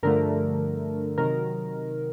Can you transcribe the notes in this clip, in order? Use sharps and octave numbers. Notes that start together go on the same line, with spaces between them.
G2 D3 F3 A3 A#4
C3 D#3 F#3 A#4